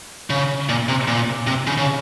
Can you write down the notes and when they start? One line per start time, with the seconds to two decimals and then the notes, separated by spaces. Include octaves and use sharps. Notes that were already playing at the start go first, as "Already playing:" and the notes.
0.30 C#3
0.69 A#2
0.89 C3
1.08 A#2
1.47 C3
1.67 C#3
1.77 C#3